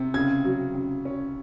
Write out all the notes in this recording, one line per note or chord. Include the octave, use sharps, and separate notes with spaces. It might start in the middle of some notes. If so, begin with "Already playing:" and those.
Already playing: C3
C#3 G#6
F#3
C#3
C#4